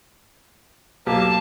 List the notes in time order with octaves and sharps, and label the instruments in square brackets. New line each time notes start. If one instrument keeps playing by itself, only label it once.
[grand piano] B1 G4 [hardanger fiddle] A#3 A5